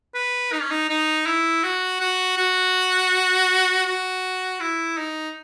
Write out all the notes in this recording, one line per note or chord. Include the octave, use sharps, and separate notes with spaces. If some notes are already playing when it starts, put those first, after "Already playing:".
B4
D#4
C#4
D#4
D#4
E4
F#4
F#4
F#4
F#4
E4
D#4